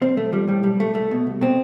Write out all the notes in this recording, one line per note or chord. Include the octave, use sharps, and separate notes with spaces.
B1 C4
B1 A3
F3 G3
A2 G3
B1 G3
B1 A3
C2 A3
B2
C2
B2 C4